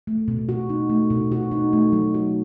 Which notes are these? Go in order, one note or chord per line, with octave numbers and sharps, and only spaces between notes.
A3
B2
F#4
D#4
A3
B2
F#4
D#4
A3
F#3
F#4